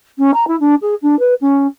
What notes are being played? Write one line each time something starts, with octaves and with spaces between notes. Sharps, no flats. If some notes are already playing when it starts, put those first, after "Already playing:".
C#4
A#5
E4
D4
G#4
D4
B4
C#4